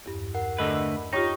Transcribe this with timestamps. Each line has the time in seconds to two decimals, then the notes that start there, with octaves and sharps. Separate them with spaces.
0.06 E2 G2
0.35 A#4 F#5 C7
0.58 D3 A3 B4 D#5
1.13 D#4 F4 G4 C#5 G5 C#6 D#6